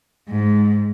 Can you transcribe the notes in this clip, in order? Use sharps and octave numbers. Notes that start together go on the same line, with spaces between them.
G#2